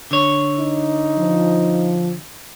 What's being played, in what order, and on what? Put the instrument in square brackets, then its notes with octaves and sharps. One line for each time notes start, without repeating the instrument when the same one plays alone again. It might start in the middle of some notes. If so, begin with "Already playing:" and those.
[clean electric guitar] D3 C#5
[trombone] D#4
[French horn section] F3